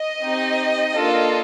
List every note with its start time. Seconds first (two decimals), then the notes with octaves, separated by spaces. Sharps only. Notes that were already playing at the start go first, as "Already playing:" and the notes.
Already playing: D#5
0.23 C4 D#4 G4
0.96 A#3 D4 F4 A4